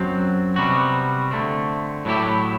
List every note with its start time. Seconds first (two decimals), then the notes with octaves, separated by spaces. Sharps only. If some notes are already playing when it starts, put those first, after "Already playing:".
Already playing: F#2 F#3 C4
0.56 C3 G3 B3 F#4
1.31 D3 A3 C4
2.05 A2 F#3 A3 E4 G4